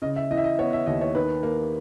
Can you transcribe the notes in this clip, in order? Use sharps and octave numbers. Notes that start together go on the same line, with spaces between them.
C#3 D#5
E5
E3 D#5
E5
D#5
B3 C#5
E5
D#2 D#5
C#5
D#3 B4
A#3